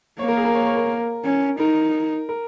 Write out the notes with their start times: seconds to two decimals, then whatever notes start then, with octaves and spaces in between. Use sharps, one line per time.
0.19 A#3 C#5
0.28 A#4
0.37 G#4
0.45 A#4
0.55 C#5
0.66 C#5
0.77 A#4
1.25 C#4
1.59 D#4 A#4
2.29 A#4